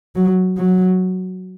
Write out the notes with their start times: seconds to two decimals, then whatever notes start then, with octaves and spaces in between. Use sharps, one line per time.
0.15 F#3
0.57 F#3